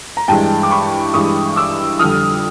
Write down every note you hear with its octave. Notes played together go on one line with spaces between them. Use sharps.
A#5
G2 E3 G#3 G5 A5
D6
B5 C#6
G2 E3 G#3 C#6 D#6
D6 E6
F2 D3 G3 D#6 F6